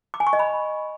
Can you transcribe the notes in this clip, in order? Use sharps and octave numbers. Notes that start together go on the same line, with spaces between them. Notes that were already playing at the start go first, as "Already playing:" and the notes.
D6
G#5
C#6
D#5
B5